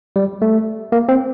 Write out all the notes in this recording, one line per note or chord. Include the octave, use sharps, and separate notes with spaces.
G3
A3
A#3
C4